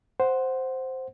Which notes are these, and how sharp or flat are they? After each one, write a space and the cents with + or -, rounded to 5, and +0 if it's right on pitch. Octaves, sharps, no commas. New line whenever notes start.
C5 +0 F#5 +0